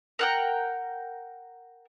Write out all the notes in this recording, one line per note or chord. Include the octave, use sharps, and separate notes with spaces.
A#4 F#5 G5